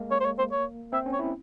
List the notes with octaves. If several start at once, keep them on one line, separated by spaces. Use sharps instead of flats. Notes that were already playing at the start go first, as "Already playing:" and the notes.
Already playing: G#3 A#3
C#5
C5
C#5
C5
C#5
C4 E5
C#4
C#5
E4